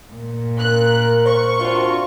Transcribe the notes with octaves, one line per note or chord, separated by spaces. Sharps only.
A#2
A#4 F#6
C5 C#6
C3 D4 F4 F#4 C5